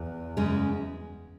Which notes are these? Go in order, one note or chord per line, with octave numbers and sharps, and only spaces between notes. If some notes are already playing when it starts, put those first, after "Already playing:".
Already playing: E2
F#2 C#3 G#3 C#4